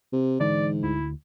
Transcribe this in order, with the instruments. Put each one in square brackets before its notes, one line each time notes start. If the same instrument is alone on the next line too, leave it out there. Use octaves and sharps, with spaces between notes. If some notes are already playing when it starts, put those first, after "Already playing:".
[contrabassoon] C3
[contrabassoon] G#2 [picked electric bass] D3 E3 D4 [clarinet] D5
[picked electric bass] D2 [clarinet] E4